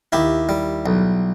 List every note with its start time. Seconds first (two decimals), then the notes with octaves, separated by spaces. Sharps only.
0.12 D#2 E4 G4
0.49 G3
0.86 B1